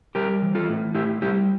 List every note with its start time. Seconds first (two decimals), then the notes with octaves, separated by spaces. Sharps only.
0.15 G3 G4 A#4
0.42 E3
0.55 F4 A4
0.69 A2
0.95 A2 E4 G4
1.22 G3 E4 G4